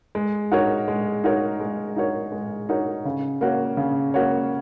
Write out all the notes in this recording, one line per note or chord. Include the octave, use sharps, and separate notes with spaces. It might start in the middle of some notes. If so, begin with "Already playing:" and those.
G#3
D#4 F#4 A#4 C#5
G#3
D#4 F#4 A#4 C#5
G#3
D#4 F#4 A#4 C#5
G#3
D#4 F#4 A#4 C#5
C#3
A#3 F#4 C#5
C#3
A#3 F#4 C#5